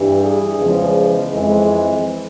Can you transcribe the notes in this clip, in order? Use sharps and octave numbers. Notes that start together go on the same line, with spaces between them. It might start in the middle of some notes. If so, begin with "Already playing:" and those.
Already playing: G2 E3 G3
G#4
E2 C#3 F3 G#3
F2 E3 G#3